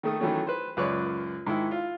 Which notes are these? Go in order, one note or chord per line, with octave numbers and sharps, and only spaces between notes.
D#3 A3 D#6
D#3 E3 F#3 A3 C#4
B4 C5
C#2 F#2 B4 C#5 D5 C#6
G#2 D#3 E4
F4